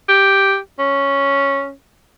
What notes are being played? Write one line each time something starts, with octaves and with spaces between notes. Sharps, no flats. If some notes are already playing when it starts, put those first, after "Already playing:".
G4
C#4